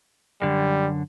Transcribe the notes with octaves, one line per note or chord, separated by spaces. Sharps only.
F#2 D3 G3